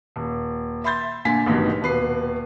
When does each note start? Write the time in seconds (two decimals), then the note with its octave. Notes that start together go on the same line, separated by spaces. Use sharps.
0.16 D#1
0.84 E5 B5 C6 G6 A6
1.25 A#2 D3 G#5 B6
1.46 A1 G2 B2 D#3
1.82 D#1 B2 B4 C7